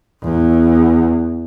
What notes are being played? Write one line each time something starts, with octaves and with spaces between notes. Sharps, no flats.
E2